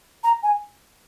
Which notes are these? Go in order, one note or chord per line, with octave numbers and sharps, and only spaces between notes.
A#5
G#5